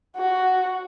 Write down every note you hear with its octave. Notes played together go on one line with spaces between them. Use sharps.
F#4